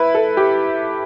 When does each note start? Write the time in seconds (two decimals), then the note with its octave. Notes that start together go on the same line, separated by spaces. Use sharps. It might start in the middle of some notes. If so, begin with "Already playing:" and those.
Already playing: E4 B4
0.15 A4
0.37 G4